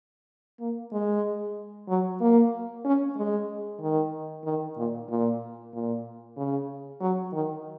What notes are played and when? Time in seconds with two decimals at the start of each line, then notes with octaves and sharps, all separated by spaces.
0.60 A#3
0.92 G#3
1.88 F#3
2.21 A#3
2.85 C#4
3.17 G#3
3.81 D#3
4.45 D#3
4.77 A#2
5.09 A#2
5.73 A#2
6.37 C#3
7.01 F#3
7.33 D#3